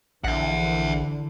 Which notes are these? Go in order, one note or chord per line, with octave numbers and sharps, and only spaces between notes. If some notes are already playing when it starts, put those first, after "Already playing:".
A#1 D3 E3 E5 F#5